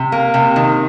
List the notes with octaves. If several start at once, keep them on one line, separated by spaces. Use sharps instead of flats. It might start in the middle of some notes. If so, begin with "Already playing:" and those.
Already playing: C3
A#3
C3
D#3